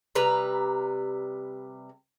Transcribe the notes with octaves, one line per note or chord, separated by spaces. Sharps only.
C3 G3 B4 A#5